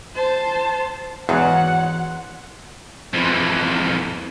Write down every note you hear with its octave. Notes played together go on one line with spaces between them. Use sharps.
C5 A5
E2 G#2 E3 F#3 F5 F#5
F2 E3